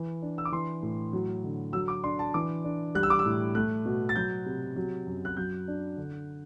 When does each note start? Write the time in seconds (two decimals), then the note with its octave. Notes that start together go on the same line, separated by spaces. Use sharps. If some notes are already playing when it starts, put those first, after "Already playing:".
Already playing: E3
0.22 D4
0.38 E6
0.45 D6
0.52 E3 C6
0.83 A2
1.13 F#3
1.44 D3
1.73 F#3 E6
1.88 D6
2.03 D4 C6
2.19 A5
2.34 E3 D6
2.64 D4
2.95 G3 F#6
3.03 E6
3.10 D6
3.19 E6
3.26 A2
3.55 A3 F#6
3.85 B2
4.09 A6
4.16 F#3 G6
4.46 C3
4.76 F#3
5.06 F#2
5.25 F#6
5.37 F#3 G6
5.68 D4
5.97 D3